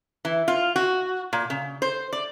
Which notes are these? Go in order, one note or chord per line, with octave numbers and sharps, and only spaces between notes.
E3
F4
F#4
A#2
C#3
C5
D5